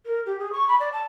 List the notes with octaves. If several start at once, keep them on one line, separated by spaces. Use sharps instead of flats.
A#4
G4
G#4
C#6
B5
D5
A5